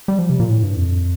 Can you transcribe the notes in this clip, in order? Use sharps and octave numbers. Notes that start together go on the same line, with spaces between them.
G3
F3
C3
A#2
A2
G2
F2